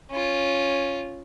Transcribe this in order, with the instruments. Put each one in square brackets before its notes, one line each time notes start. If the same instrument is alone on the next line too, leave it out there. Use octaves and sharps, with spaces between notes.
[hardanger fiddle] C#4 F4